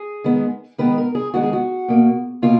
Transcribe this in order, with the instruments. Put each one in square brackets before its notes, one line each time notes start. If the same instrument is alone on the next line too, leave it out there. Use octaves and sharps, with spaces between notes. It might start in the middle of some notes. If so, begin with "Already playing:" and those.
Already playing: [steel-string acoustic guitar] G#4
D#3 G#3 B3
D#3 G#3 B3 B4
A#4
G#4
D#3 G#3 B3 F#4
G#4
F#4
B2 A#3
B2 A#3 F4